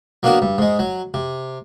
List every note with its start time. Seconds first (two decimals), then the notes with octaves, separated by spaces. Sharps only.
0.23 F#3 A#3 B3 D4 F#4 A#4
0.42 G2
0.58 G#2 G#3
0.79 F#3
1.14 C3